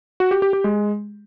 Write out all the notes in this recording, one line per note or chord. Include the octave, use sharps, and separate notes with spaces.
F#4
G4
G4
G4
G#3